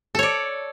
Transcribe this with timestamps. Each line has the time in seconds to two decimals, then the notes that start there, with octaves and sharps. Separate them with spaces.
0.15 A4
0.19 C#5
0.23 D5